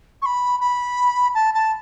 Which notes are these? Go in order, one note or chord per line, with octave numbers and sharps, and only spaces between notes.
C#6
B5
B5
A5
A5